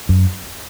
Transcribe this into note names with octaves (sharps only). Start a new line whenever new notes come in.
F#2